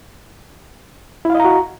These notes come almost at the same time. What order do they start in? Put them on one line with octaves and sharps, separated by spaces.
E4 F5 D#5 A#5 F#4